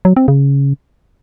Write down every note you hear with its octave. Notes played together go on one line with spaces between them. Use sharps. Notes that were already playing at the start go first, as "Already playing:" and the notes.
F#3
C4
C#3